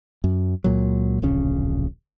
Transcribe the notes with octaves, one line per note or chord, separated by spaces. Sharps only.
F#2
C#2 A#2 F#3
D1 A#1 C#3 C#4